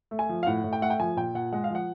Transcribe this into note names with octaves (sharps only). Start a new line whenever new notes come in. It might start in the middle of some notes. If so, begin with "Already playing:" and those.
A3
G#5
F3
F5
A2 F#5
A2
G5
A3 F#5
G5
F3 G#5
A#2 G5
A#2 F#5
G#3 F#5
F5
F3 F#5